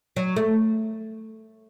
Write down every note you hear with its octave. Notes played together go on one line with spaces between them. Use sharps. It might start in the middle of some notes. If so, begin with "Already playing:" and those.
F#3
A3